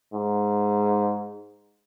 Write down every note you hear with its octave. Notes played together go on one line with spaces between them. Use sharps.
G#2